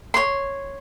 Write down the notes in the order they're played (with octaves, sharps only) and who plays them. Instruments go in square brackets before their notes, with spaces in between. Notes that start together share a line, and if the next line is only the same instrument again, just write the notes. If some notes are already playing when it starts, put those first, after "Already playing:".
[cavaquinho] C#5 C6